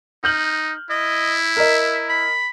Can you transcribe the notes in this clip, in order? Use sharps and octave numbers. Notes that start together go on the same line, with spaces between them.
D#4 F6 G6 F#7
E4 D#5
A#4 D#5 E5
B5